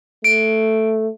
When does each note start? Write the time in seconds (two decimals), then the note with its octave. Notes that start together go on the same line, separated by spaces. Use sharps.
0.24 A3 D7